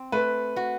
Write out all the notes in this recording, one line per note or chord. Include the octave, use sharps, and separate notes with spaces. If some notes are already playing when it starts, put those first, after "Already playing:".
Already playing: C4
A3 B4
F#4